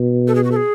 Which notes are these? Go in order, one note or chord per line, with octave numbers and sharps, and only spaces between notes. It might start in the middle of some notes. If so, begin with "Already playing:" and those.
Already playing: B2
A4
G#4
F#4
A4
G#4